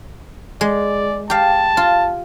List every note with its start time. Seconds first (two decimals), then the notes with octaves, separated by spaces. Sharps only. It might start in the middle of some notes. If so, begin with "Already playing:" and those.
0.61 G#3 D5
1.30 G4 F5 A5
1.77 F4